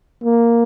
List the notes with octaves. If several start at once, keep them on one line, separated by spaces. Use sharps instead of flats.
A#3